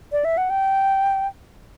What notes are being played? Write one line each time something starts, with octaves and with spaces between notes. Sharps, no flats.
D5
E5
F#5
G5